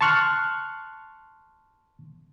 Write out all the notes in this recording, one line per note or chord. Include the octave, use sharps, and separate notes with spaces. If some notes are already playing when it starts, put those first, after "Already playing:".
A5 C6 C#6 F6 F#6